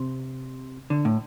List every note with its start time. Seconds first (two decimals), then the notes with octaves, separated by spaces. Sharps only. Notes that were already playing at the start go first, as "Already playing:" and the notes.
Already playing: C3
0.90 D3
1.05 A2